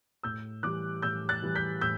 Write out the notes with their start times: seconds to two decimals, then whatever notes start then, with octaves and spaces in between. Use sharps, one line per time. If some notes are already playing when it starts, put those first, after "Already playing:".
0.23 A2 E6 G6
0.63 E3 G3 D6 F#6
1.02 A2 E6 G6
1.29 F#6 A6
1.42 E3 G3
1.55 G6 B6
1.81 A2 E6 G6